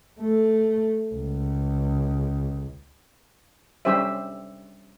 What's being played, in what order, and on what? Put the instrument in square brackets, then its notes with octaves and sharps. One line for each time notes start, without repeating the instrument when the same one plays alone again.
[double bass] A3
C#2
[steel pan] G3 C#4 G4 C5 E5